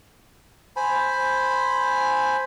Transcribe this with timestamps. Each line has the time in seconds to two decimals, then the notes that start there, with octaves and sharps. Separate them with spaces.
0.76 C5 G#5 B5